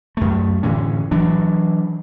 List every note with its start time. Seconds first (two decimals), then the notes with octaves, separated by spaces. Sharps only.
0.17 F#2 A3
0.63 A2 D3 E3 C#4
1.11 E3 F#3 D4